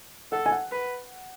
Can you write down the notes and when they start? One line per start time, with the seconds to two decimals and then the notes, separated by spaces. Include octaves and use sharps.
0.32 A4 F#5
0.46 G#5
0.52 F#5
0.72 B4